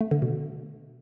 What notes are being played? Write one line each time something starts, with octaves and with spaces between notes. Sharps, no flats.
A3
D3
B2